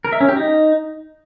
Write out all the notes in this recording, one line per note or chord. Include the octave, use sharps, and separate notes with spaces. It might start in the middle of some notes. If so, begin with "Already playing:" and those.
A#4
E5
C#4
G4
D#4